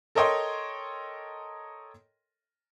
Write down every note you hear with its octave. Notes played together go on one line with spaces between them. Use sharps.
A4 A#4 C#5 D#5 G5 C6